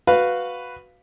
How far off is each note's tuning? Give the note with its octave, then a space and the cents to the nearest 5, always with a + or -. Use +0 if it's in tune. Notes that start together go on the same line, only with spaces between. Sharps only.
F#4 -5 B4 +5 F5 +0